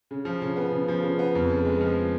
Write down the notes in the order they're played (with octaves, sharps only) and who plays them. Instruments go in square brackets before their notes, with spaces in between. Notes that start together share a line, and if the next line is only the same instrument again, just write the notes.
[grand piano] C#3
F3
C#3
B3
C#3
F3
C#3
B3
F2
C#3
G#3
F3